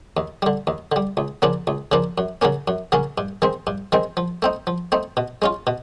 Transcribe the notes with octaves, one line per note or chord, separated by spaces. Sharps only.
D#2
D3 G3
D#2
D3 G3
C#2
C#3 F3 A#3 D4
C#2
C#3 F3 A#3 D4
F#2
C#3 F#3 A#3 C#4
F#2
C#3 F#3 A#3 C#4
G2
D#3 G#3 C4
G2
D#3 G#3 C4
F3
A3 C4 D#4
F3
A3 C4 D#4
B2
G#3 C#4 F4
B2